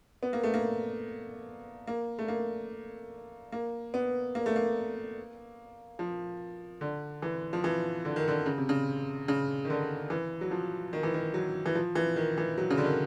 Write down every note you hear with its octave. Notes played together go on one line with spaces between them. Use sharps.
B3
A#3
A3
A#3
A#3
A3
A#3
A#3
B3
A#3
A3
A#3
F3
D3
E3
F3
E3
D3
D#3
D3
C#3
C3
C#3
C#3
D#3
D3
E3
F#3
F3
D#3
E3
D#3
F#3
E3
F3
E3
D#3
E3
F#3
C#3
D3
D#3